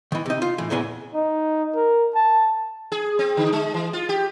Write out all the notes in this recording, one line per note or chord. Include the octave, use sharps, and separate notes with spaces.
D#3 E3
C3 D#4
F4
A2 E3
E2 A#2 C#3 E3 G#5
D#4
A#4
A5
G#4
C4
D3
G#3
E3
F4
G4